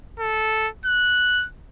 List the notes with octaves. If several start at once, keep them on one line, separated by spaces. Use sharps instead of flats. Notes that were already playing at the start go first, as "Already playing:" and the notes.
A4
F#6